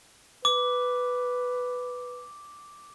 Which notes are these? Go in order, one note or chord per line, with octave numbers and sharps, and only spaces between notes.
B4 D6